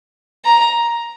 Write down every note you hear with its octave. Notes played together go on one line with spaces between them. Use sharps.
A#5